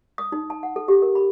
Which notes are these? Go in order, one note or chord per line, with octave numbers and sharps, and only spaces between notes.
D#6
D#4
A5
F#5
A4
G4
A#4
B5